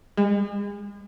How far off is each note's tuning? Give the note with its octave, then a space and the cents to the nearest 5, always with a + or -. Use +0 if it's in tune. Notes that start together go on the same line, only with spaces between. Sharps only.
G#3 -40